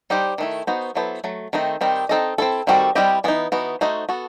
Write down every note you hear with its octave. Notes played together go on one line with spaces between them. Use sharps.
G3 D#4 G4 C5
D#3 A3 E4
B3 D#4 F#4 C5
F#3 B3 E4 A4 C5
F#3 A3
D#3 A3 C4 D#4
D#3 G3 C4 D#4
C4 D#4 A4 D#5
C4 E4 A4
D#3 G3 C4 F#4 A4
G3 C4 E4 G4 D#5
E3 B3 D#4
E3 B3 D#4 F#4
A3 D#4 F#4 C5 D#5
B3 F#4 A4